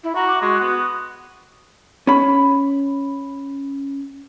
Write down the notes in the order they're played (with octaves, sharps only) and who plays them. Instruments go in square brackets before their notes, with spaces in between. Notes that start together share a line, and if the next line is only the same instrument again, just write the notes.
[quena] E4
[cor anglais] F#4 [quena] A#5
[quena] D6
[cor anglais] G#3 [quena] F#4
[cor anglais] B3
[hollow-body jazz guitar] C#4 B5